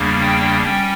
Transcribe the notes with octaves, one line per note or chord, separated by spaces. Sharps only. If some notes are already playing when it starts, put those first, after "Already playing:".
Already playing: E2 C#3 G3 A#3 D4
G5
G3 C#4 G5